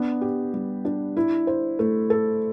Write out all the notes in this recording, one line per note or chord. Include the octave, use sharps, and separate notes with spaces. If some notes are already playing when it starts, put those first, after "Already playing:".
Already playing: B3 D4
G4
G3
D4
E4
C5
A3
A4